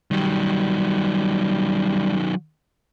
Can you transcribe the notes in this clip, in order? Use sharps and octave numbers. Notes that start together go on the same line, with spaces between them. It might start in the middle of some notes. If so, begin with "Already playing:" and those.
D#3 F#3 G3